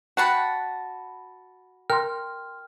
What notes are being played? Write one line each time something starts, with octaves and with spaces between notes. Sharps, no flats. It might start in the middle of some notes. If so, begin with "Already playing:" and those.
F#4 F#5 G5 A5 B5
A#4 G5 C6 F6